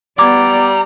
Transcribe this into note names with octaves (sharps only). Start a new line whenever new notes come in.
G3 B3 D5 A#5 D6